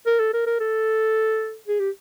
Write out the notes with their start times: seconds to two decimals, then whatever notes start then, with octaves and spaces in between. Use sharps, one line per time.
0.06 A#4
0.20 A4
0.34 A#4
0.47 A#4
0.60 A4
1.67 G#4
1.80 G4